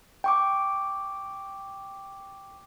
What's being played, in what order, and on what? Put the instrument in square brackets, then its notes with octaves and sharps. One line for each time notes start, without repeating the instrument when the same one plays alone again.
[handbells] G5 C#6 D6